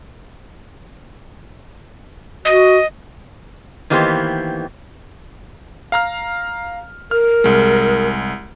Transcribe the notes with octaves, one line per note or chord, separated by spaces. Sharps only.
F#4 D#5
D#3 E3 A#3 B3 G4 C5
F5 A#5 F6
A#4 F6
C2 G#3